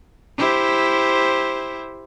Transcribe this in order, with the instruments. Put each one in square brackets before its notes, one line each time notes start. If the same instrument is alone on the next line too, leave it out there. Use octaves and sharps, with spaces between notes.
[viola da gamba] E4 G4 C5